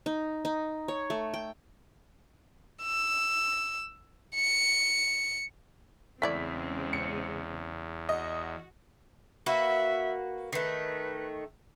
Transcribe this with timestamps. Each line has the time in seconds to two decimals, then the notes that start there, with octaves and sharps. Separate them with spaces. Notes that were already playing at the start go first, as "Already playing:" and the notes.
0.06 D#4
0.45 D#4
0.88 C#5
1.10 A3
1.34 G5
2.83 E6
4.36 C#7
6.22 E2 C#3 G#3 A3 C4 E4 D5 B6
6.93 C#7
8.09 F#4 D#5
9.46 A#3 F#4 B4 E5
10.53 D#3 A3 B4